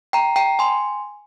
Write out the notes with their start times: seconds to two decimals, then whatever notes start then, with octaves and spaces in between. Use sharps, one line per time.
0.13 G5 A#5
0.36 G5 A#5
0.59 G#5 C6